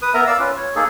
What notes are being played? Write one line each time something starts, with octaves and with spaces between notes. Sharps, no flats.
B4 D#6
B3 A#4 E5 A#5
D5 F5 E6
C#4 F4 B4
C#5
A#3 D#4 G#4 A4